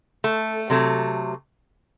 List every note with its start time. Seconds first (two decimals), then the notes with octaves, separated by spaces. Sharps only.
0.24 A3
0.70 C3 F#3 A3